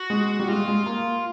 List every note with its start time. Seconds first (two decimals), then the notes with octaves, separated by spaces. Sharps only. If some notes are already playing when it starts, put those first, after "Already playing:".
Already playing: F#4
0.10 G#3
0.39 G3
0.49 G#3 F4
0.68 G#3
0.86 A#3